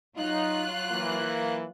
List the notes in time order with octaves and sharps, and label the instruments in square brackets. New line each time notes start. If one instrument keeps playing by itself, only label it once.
[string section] F#3 F4 F#6 [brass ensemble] D#4
[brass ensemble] E3 A#3